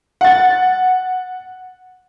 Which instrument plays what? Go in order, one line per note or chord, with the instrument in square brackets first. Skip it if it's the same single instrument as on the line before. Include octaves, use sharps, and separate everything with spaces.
[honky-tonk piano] F#5 A6